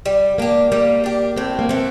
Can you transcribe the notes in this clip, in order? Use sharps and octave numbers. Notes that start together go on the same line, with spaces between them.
G3
A#3 D4 G4
G3 A#3
D4 G4
A2 C4
A#3
E3 A3 C4